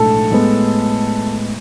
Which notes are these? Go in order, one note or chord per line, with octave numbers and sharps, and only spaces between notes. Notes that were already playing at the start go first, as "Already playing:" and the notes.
Already playing: B1 A2 F3 G#3 D4 A4
A2 G#3 B3